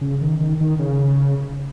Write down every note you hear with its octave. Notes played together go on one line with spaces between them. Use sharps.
C#3
D#3
D#3
D#3
C#3